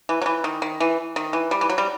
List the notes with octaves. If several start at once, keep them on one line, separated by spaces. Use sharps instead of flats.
E3
F#3
E3
D#3
D#3
E3
D#3
E3
G3
E3
F#3
G3